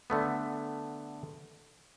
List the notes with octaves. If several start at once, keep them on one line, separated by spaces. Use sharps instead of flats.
D3 A3 B3